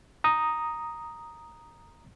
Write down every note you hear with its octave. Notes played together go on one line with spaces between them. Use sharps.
A#5 D#6